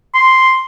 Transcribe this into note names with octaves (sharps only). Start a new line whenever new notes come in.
C6